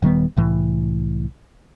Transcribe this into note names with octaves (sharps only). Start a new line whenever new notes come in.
D#1 D#3 G3 B3
C2 A2 E3